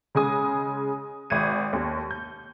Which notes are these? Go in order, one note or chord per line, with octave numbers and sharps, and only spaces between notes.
C#3 G#3 G#5 D#6
G#1 E5 G#6 D#7
D#2
G6